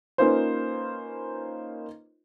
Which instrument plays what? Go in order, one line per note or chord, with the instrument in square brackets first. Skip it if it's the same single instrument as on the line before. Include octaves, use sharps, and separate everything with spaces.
[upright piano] A#3 C#4 D#4 F4 B4 C5